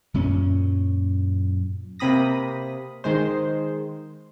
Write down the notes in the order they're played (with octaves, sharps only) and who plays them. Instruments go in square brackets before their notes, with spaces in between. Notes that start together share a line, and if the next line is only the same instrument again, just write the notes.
[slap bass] F#2 A#2 C#4
[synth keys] C3 A#3 C4 B5 D#6 A#6
D#3 G#3 C5